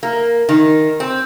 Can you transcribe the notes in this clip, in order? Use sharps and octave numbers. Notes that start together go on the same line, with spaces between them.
A#3
D#3
C4